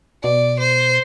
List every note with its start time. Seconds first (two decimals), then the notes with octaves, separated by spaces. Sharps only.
0.24 B2 D5
0.59 C5